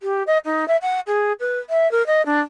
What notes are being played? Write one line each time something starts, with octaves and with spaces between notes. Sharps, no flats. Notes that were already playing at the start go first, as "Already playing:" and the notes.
G4
D#5
D#4
E5
F#5
G#4
B4
E5
A#4
D#5
D4